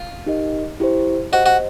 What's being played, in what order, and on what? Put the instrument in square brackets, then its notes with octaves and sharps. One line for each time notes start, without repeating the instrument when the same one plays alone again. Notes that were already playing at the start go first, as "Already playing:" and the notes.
Already playing: [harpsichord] F4
[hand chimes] D#4 G4 A#4 D#5
E4 G4 C5
[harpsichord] F#4 [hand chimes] G4 C5 D#5
[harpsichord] F#4